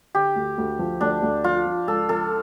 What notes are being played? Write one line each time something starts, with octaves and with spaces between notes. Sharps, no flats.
D3 G4
D2
D2
F3
D2 D4
D2
F3 F4
F3
C#2 A4
F3 A4